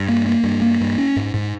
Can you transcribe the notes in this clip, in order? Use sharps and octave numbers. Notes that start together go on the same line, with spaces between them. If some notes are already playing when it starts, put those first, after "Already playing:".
Already playing: G2
A#3
A#3
G2
A#3
G2
C#4
G#2
G#2